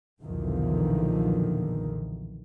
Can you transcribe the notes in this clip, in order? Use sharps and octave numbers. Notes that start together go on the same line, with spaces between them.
B1 E2 A#2 D3 D#3 F3